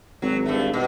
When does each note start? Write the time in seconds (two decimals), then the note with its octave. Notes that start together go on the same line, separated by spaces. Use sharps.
0.22 G#1 F#3
0.46 G2 A3
0.74 B2